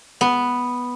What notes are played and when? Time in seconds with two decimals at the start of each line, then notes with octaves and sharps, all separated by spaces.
0.21 B3